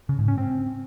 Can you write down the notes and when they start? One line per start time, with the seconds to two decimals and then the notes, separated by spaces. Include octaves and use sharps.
0.09 C#3
0.19 G#2
0.28 C#4
0.38 C4